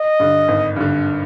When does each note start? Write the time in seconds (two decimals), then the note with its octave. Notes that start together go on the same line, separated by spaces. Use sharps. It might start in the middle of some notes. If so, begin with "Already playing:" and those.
Already playing: D#5
0.20 G2 D3
0.48 G#1
0.76 G2 D3